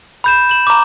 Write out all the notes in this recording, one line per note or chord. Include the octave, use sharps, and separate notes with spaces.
B5 G6 E7
E7 F#7
A#5 D6